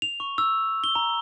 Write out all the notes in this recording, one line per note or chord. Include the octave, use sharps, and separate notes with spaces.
F7
C#6
E6
G7
A#5